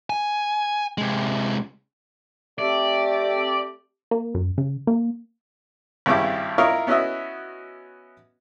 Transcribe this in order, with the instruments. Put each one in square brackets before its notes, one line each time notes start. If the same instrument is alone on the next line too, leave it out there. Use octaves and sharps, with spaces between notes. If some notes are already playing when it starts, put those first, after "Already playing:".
[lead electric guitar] G#5
C3 G#3
[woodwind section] A3 C4 G4 [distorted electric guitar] D5
[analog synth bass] A#3
F#2
C#3
A#3
[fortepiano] G#1 G2 C#3 E4 G4 D6
E4 F4 A#4 C#5 D#5
B3 C#4 E4 F#4 D#5 E5